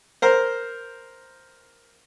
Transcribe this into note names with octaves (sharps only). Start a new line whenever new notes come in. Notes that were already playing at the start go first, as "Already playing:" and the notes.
A#4 C5